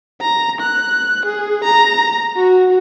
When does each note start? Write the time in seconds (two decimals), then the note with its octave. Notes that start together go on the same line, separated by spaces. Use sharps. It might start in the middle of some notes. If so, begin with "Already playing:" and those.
0.22 A#5
0.61 F#6
1.26 G#4
1.64 A#5
2.37 F#4